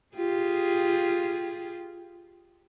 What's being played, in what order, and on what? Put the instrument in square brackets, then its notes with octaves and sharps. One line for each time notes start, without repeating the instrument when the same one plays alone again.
[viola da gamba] F4 G4 G#4